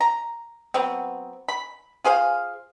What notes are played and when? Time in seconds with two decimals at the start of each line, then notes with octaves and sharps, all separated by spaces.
0.01 A#5
0.74 F#3 B3 C4
1.48 B5
2.04 F4 G#4 C5 F5